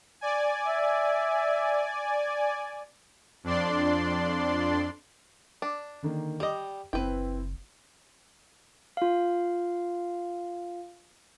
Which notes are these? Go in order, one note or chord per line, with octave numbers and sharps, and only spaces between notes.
D5 G#5
E5
F2 D4 D5 C6
D4
D3 D#3 A#3
G3 G4 D#5 G5
F#1 C4 E4 B4 G5
F4 F5